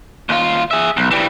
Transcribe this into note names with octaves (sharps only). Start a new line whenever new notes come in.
D#2 F4
G#4 E5
B1
E3 G3